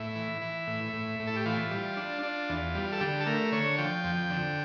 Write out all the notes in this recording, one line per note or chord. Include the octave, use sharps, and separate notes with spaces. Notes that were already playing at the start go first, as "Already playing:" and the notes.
Already playing: A2 E4
E3
E3
A2
A2
A2
A4
G4
E3 F4
G3
D4
D4
E2
G3
A4
D3 G4
A4
A3 A#4
D3 C#5
F3 G5
F2
D3